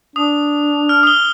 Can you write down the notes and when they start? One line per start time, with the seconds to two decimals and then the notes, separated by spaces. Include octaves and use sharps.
0.16 D4 D#6
0.89 F6
1.03 D#6 G7